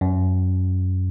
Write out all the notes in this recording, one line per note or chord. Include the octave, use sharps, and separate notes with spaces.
F#2